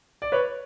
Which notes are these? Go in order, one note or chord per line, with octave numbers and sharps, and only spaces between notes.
D5
B4 C#5